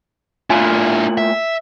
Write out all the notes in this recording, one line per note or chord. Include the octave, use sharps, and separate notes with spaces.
A2 D4 E4 F4 G#5
E5